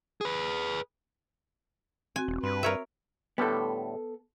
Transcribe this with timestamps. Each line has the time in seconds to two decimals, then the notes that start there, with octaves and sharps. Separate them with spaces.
0.21 G#4 B4
2.16 C4 F#4 G#5
2.28 E1
2.43 G2 B4 C6
2.63 A#4 C#5 E5
3.38 A2 D3 G3 B3 A4